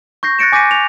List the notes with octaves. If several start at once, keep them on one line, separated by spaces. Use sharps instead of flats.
C#6 G6 A#6 C7
F#6 A6 A#6 C#7 D7 E7
G#5 D6 G6 A#6 B6 D#7
F7